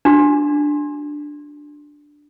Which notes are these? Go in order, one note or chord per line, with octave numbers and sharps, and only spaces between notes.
D4 F#4